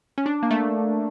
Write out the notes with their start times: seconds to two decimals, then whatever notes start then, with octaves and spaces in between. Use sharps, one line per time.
0.18 C#4
0.26 D4
0.43 A#3
0.51 A3